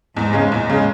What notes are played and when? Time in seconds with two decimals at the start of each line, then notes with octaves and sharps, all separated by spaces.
0.16 E2 G#2
0.33 C#3 G#3
0.51 E2 A#2
0.70 C#3 G#3